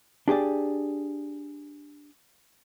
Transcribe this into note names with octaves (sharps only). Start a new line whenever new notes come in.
D4 G4 G#4 D5